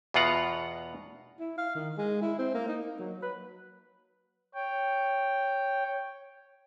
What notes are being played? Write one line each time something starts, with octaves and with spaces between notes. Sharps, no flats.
E2 B2 B3 F4 F#5 A#5
E4
F5
D#3
G#3
E4
C4
A#3
D#4
A#3
F#3
B4
C#5 G5